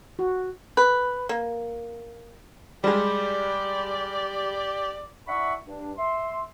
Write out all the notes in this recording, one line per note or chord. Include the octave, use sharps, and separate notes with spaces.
F#4
B4
A#3
G3 G#3 G4 D5
D4 E4 E5 F#5 B5 C#6
G2 D4
E5 C6